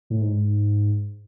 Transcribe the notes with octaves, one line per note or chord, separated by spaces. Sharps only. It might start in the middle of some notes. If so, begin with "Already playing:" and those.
A2
G#2